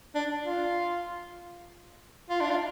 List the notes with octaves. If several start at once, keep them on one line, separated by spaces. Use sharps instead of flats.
D4
F4
F4
D4
F4